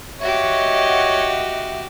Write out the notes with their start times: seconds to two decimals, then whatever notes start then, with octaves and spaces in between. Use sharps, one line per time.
0.21 F#4 G4 C#5 D#5 E5 F#5